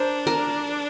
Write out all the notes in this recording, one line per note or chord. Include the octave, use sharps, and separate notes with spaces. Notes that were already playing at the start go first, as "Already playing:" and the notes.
Already playing: D4 A#4 C5
A#4